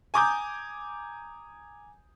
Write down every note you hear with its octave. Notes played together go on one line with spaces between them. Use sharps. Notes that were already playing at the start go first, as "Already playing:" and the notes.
G#5 A#5 D6 D#6 G6